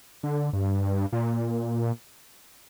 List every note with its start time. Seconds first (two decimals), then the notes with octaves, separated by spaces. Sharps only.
0.23 D3
0.53 G2
1.12 A#2